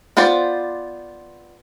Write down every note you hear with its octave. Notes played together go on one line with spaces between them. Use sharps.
B3 F4 C5 D5